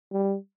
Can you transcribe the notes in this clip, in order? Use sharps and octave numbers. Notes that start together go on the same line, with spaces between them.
G3